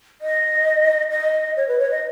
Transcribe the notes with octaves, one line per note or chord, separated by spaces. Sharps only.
D#5
D#5
C#5
B4
C#5
D#5